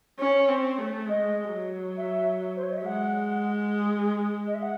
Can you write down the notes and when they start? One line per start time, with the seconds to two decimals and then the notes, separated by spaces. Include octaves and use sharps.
0.20 C#4 C#5
0.49 C4
0.79 A3
1.08 G#3 D#5
1.53 F#3
1.97 E5
2.56 C5
2.63 C#5
2.71 D#5
2.77 E5
2.86 G#3 F#5
4.47 D#5
4.55 E5
4.62 F#5